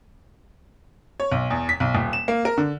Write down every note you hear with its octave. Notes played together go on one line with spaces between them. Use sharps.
C#5
B1
E2
B6
B1
D#1
E7
A#3
A#4
D3